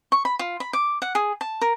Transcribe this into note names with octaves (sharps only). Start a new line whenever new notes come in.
C#6
B5
F4
B5
D6
F#5
G#4
A5
A#4